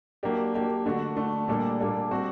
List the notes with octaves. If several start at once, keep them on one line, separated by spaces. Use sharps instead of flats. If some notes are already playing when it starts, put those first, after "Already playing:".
F#3 A#3 D4 G4
F#3 A#3 D4 G4
D3 A3 D4 F#4
D3 A3 D4 F#4
A#2 G3 A#3 D4 A4
A#2 G3 A#3 D4 A4
G3 C4 F#4